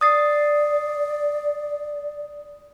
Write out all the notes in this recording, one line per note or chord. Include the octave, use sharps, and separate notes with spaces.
D5 D#6 A6 C7